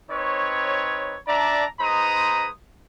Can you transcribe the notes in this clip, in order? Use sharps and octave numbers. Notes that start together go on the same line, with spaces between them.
C4 D#4 B4 C#5
D4 D5 E5 A5 A#5
G#3 D#4 B4 C5 A#5 D#6